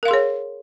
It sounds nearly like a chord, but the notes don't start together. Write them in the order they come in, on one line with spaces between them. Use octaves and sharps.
A#4 F5 C6 G#4 C#5